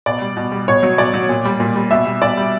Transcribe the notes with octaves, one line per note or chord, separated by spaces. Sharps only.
B2 D5
G3
B2
G3
B2 C#5
F#3
B2 D5
F#3
A#2
G3
A#2
G3
B2 E5
G3
B2 D5
G3